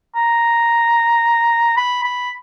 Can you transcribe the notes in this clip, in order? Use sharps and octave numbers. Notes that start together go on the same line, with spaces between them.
A#5
B5
B5